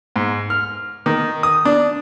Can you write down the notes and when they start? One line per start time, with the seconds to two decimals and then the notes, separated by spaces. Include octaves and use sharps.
0.16 G#2
0.50 F6
1.06 D#3
1.43 D#6
1.65 D4